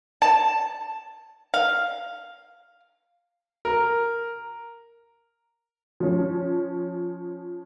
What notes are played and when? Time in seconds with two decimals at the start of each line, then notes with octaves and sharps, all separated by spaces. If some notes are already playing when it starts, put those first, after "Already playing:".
0.22 A5
1.54 F5
3.65 A#4
6.00 F3 C#4